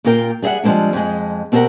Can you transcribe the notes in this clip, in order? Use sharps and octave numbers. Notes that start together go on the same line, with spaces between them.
A#2 A#3 F4 A#4 G5
G3 G#4 D5 E5 F#5
F3 G3 G#3 A#3 C4 D4
F2 G#3
B2 C4 G4 A4 A#4 F#5